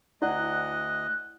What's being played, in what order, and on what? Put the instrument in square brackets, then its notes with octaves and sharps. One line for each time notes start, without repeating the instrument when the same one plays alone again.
[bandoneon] D2 D#5 [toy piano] E4 D5 F#5 [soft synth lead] F#6